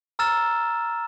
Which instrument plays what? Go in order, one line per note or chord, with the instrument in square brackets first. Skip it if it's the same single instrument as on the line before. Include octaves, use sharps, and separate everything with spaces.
[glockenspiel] A#5 E6 F6 A6 E7